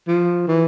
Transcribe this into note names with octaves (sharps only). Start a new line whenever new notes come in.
F3
E3